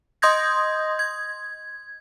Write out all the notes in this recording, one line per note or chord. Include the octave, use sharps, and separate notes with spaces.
D#5 C6 D#6 G6 G#6 A#6
G#6